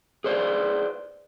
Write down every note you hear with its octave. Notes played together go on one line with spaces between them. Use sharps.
G#4 B4 C5 D5